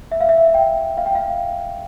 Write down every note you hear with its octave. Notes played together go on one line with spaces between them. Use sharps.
E5
F5
E5
G5
F5
G5
F5